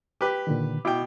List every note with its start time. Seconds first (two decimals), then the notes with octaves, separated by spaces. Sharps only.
0.21 G4 B4
0.47 A#2 D3 D#3
0.85 B2 E4 G5 D6